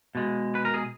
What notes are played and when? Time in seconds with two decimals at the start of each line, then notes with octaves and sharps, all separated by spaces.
0.15 B2 G#3
0.55 B4
0.65 A#4
0.74 G#4